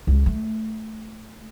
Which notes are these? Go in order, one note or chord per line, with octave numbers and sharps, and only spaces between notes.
C#2
A3